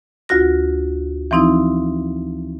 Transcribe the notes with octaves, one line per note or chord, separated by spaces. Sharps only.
D2 F4 F#4 A#6
E3 F3 C4 D#4 E4